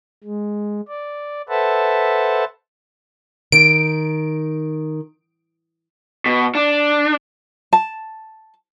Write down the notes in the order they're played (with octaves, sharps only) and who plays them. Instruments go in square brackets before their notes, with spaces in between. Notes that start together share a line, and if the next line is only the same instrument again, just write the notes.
[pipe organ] G#3
D5
A4 B4 C5 E5 F#5 A5
[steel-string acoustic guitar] D#3 [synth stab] D7
[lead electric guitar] B2
D4
[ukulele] A5